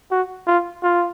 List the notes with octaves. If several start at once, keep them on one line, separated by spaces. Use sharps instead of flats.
F#4
F4
F4